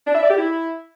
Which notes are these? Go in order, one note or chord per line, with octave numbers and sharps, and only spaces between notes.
D4
E5
D5
G4
E4